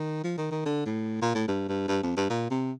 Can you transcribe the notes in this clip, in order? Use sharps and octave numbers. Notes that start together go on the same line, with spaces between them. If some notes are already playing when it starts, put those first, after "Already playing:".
Already playing: D#3
F3
D#3
D#3
D3
A2
A#2
A2
G2
G2
G2
F2
G2
A#2
C3